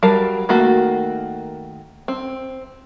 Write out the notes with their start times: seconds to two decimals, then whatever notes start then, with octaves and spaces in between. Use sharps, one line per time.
0.03 F#3 G3 A#4 F5 A5
0.49 D#3 A3 A#3 F#4
2.08 C4